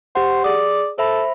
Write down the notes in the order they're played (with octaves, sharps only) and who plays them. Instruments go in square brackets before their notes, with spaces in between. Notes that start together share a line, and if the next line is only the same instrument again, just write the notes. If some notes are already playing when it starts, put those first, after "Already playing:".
[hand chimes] G4 F#5 [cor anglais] C5
[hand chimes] G#4 D#6 [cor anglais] D5
[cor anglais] A4 [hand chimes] C5 E5 B5